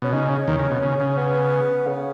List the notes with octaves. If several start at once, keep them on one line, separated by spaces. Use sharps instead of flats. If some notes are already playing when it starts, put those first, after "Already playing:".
B2 C#4
C#3 D#4
C#4
D#2 D#3
C#3
B2
C#3
C#3
B3
C#3